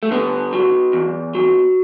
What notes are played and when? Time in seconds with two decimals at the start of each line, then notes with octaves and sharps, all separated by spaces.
0.03 A3
0.11 D3 B3
0.53 F#3
0.93 E2
1.34 F#3